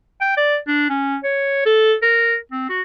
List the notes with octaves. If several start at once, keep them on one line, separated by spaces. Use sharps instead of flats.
G5
D5
D4
C#4
C#5
A4
A#4
C4
F#4